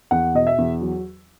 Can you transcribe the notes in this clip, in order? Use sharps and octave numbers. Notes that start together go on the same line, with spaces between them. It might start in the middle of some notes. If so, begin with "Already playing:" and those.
E2 F#5
B2 D#5
E5
E2
F#3